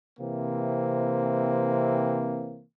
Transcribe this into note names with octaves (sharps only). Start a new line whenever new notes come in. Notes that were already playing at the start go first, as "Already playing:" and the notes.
C3 E3 A#3 C4